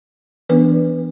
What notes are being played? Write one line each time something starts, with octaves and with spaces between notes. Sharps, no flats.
E3 B3 D4 B4